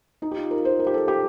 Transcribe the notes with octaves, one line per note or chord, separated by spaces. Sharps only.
D#4
G4
F4
A#4
C5
A#4
G4
A4
G4